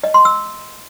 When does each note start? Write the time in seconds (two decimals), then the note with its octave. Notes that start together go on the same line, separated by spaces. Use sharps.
0.04 D#5
0.14 C6
0.25 E6